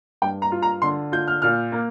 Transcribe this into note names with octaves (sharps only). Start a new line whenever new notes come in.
G2 G5
A#5
F4
A#5
D3 C6
F4 G6
F6
A#2 F6
A#3